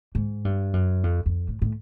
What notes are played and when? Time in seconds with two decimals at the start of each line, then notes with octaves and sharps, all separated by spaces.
0.15 G#2
0.45 G2
0.73 F#2
1.03 F2
1.26 F2
1.48 A2
1.62 A2